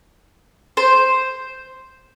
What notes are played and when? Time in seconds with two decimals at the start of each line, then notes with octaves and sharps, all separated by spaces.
0.77 C5